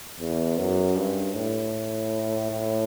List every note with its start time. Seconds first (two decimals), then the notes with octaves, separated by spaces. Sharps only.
0.19 E2
0.58 F#2
0.97 G2
1.35 A2
2.51 A2